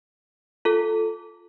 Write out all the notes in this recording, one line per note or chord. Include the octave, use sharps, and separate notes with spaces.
F4 A4